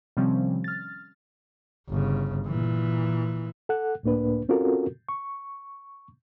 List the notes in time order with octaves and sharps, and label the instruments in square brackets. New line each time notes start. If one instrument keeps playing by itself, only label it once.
[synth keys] C3 D#3 F3 G3 C4 C#4
F6 A6
[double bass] G1 C#3
A#2 E3
[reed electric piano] A4 F#5 F#6
C#2 A2 A#3 D4 B4
C4 C#4 F4 F#4 A4 A#4
C#6